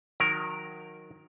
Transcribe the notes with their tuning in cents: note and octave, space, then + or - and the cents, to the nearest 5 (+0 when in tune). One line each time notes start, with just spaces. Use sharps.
D#3 +0 F#3 -30 A#4 +0